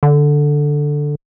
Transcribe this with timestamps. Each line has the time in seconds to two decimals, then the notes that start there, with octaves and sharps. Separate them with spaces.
0.03 D3